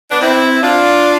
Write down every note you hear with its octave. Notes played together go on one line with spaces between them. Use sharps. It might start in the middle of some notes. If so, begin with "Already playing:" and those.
B3 D4
C4 E4
D4 F4